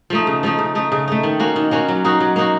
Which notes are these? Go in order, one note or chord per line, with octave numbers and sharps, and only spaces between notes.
F3 A3 D#4
C#3
F3 A3 D#4
C#3
A3 D#4
C#3
A3 D#4
D#3
A#3 C#4 F#4
D#3
A#3 C#4 F#4
F#3
A#3 D#4 F#4
F#3
A#3 D#4 F#4